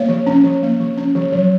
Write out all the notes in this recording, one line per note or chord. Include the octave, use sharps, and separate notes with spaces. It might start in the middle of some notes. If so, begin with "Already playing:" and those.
Already playing: A#3 C#5
F3
C#4
F3
A#3
F3
C#4
F3
F#3